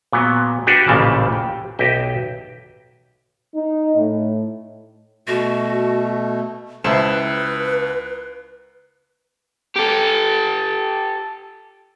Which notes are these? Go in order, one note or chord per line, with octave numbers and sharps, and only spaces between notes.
A#2 F#3 B3
D4 F#4 G4 A#4 B4
A1 A#2 C#3 E3 F3 A5
G4
B1 G4 D#5 E5
D#4
A2
B2 A3 F#4
C#2 E4 B4 C5 A5 E7
G4 A4